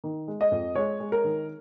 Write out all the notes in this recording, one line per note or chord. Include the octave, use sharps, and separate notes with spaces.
D#3
G#3
D#5
F2
G#3 C#5
G#3
A#4
D#3